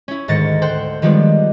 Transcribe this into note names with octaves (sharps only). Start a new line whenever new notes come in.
C#4 E4
D2 G#2 D#3 A6 A#6 C#7
A4 C5 F#5 G5
D#3 F3 G3 G#3 B3 D4